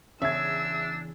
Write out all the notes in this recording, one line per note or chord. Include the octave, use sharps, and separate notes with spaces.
E2 C#3 D4 E5 E6 G#6